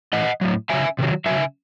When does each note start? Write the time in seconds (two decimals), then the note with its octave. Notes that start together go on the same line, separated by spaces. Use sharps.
0.13 A2 E3 D#5 F#5
0.41 A2 F#3
0.70 C#3 F#3 E5 G#5
0.99 C3 D#3 F#3
1.26 C#3 F#3 E5 G#5